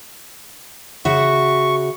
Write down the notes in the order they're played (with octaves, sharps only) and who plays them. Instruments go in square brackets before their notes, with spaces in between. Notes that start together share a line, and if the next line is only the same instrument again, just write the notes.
[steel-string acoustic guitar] C#3 F#4 E5 [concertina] C#6